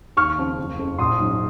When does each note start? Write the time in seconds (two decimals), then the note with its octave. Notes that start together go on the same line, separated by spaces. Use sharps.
0.17 D#2 C#6 F6
0.38 C#3 F3 C4
0.58 F#1
0.79 F2 C#3
0.98 A#1 C6 D#6
1.19 G#2 F#3